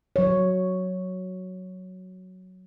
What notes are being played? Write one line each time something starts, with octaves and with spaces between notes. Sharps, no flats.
F#3 C#5